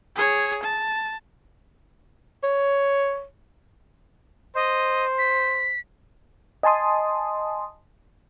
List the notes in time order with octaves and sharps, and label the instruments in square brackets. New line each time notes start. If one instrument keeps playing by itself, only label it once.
[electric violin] G#4 C#5
A5
[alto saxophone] C#5
[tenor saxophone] C5 [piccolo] D#5
[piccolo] B6
[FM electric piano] D#5 G#5 A5 C6 D#6